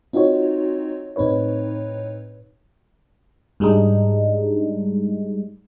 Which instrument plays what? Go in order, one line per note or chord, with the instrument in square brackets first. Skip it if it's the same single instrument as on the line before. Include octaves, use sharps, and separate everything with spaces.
[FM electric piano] C4 D#4 F4 F#4 C#5
A2 C4 D#4 B4 C#5
G#2 G3 G#3 D4 D#4